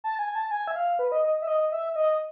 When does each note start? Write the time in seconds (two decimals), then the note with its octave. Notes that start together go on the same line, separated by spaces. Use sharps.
0.04 A5
0.19 G#5
0.35 A5
0.51 G#5
0.67 E5
0.76 F5
0.99 B4
1.12 D#5
1.23 D#5
1.42 E5
1.47 D#5
1.72 E5
1.96 D#5